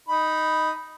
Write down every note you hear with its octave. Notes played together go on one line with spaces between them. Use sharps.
D#4 B5